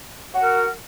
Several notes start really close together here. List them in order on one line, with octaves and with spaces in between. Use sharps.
F#4 F#5 A#4